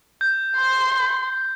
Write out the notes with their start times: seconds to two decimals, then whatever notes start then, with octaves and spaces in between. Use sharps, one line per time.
0.21 G6
0.57 C6